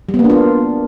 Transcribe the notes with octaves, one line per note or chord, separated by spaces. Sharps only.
G3
B3
A#3
D4
F4